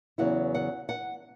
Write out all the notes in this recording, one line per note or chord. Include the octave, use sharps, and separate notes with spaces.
E2 C#3 F#3 B3 E4 F#5
F#5
F#5